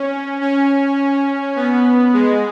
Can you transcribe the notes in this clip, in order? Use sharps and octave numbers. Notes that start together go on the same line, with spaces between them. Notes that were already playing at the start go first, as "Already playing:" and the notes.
Already playing: C#4
C#4
B3
G#3